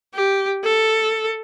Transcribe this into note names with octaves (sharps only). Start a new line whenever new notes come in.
G4
A4